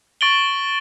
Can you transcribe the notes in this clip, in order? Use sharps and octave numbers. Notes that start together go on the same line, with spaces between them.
C#6 A6 D7 F#7 G7